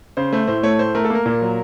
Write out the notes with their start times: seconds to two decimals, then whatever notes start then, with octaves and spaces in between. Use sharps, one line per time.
0.17 C#3 C5
0.32 A3 C5
0.47 A2 C5
0.63 A3 C#5
0.79 A2 C5
0.95 A3 A#4
1.05 A4
1.10 A#3 A#4
1.26 A#2
1.41 F#3